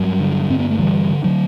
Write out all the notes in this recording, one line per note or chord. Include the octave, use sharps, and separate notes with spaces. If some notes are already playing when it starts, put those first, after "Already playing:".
Already playing: G2 F#3
D3
G2 C4
B3
A3
D3 E3 G3
D3
D3 F#3